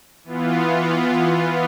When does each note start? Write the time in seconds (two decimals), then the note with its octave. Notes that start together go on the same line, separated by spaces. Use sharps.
0.24 E3 B3 F4